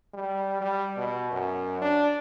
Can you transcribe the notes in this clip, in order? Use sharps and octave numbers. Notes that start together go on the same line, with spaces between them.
G3
G3
B2
F#2
D4